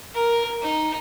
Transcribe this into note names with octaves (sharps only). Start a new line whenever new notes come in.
A#4
D#4